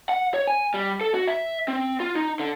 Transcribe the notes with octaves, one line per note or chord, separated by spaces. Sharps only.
F#5
C#5
G#5
G3
A4
F#4
E5
C4
F4
D#4
D3